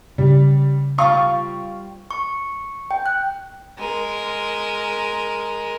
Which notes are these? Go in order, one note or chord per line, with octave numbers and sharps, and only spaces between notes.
C#3 G3
G3 C4 F4 F5 C#6
C#6
G5
F#6
G#3 A#4